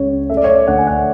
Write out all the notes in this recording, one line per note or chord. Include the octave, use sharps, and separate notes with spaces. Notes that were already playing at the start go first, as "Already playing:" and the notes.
Already playing: C#2 C#3 C#5
A3 E5
D5
C#5
D5
D2 F#5
G#5
F#5